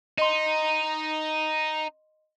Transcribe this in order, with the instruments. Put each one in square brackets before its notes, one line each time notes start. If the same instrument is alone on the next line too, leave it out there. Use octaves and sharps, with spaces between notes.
[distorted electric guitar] D#4 [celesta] D#5 C6